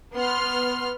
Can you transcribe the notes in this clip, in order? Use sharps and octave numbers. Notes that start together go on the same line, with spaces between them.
B3 C6 F6